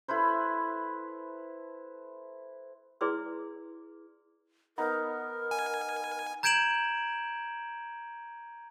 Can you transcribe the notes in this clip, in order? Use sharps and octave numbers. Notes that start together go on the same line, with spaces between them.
E4 A4 B4 C5
E4 G#4 B4 D5 C6 E6
B3 D#4 A#4
G#5
A#5 G6 G#6 D7 E7 F#7